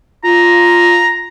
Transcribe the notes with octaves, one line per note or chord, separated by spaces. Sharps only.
F4 A#5